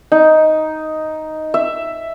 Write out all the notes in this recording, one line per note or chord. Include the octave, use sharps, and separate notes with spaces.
D#4
E5